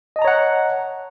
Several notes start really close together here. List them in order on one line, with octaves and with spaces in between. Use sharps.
D#5 A5 A#5 C#5 F#5